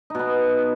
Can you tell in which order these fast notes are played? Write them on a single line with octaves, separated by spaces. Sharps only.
D#4 B2 B3